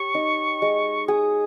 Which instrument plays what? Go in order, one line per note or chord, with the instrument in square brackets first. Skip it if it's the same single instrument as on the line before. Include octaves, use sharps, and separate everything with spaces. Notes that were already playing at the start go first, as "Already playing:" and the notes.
Already playing: [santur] G4 C#5 [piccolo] C#6
[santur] D#4
G#3
[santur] G#4 [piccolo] D#6